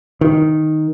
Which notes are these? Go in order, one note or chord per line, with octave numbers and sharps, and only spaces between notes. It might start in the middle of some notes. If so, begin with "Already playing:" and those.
D#3